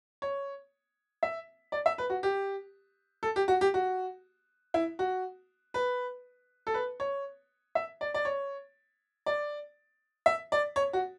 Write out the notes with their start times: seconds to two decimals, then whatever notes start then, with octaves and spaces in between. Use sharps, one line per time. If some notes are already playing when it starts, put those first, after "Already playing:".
0.22 C#5
1.23 E5
1.72 D5
1.86 E5
1.98 B4
2.10 F#4
2.23 G4
3.23 A4
3.36 G4
3.48 F#4
3.61 G4
3.74 F#4
4.74 E4
4.99 F#4
5.74 B4
6.67 A4
6.74 B4
7.00 C#5
7.75 E5
8.01 D5
8.14 D5
8.25 C#5
9.26 D5
10.26 E5
10.52 D5
10.76 C#5
10.93 F#4